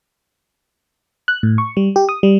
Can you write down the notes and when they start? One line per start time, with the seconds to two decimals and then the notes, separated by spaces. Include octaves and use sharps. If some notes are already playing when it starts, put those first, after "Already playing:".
1.28 F#6
1.43 A2
1.58 C#6
1.77 G3
1.96 G4
2.09 D#6
2.23 G3